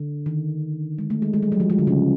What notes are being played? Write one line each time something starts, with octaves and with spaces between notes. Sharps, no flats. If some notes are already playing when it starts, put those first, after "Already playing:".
Already playing: D3
D#3
G#3
A3
G#3
G#3
G3
F#3
F3
G#3
D3
C#3